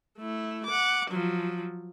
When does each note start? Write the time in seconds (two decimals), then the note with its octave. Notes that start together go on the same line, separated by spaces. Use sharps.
0.19 A3 E4
0.66 F#5 D6
1.11 F3 F#3